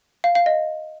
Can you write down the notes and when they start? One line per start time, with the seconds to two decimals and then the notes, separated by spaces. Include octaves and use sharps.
0.24 F5
0.35 F5
0.46 D#5